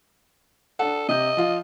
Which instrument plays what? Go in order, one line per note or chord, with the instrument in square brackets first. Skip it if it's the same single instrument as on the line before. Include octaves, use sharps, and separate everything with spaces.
[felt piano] D4 F#5 [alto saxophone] A4
[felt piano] C3 G6 [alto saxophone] D#5
[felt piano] F3 F4